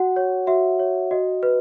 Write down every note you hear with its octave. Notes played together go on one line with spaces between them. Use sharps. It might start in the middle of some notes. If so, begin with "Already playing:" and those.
Already playing: F#4 F#5
C#5
F#4 E5
C#5
F#4 D#5
B4